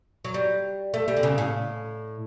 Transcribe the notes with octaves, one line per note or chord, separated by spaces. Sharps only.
F#3
G3
A3
G3
D3
C#3
A2